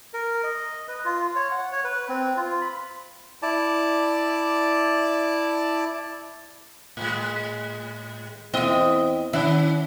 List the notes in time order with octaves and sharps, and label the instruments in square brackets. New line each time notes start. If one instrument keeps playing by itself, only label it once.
[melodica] A#4
D#5
B4
F4
C#5
F#5
C#5
B4
C4
F4
B5
E4 D5 A5
[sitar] A2 G#3
[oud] E2 C4 [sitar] E4 D#5
[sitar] D#3 C#4 [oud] E4